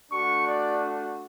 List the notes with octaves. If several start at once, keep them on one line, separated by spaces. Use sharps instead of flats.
A3 D4 F#4 C#6
D5